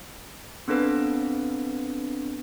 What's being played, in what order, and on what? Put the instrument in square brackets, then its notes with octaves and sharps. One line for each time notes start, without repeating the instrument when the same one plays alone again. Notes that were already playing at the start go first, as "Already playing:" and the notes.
[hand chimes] B3 C4 D4 A4 B4